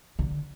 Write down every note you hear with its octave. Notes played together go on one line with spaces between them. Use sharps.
D3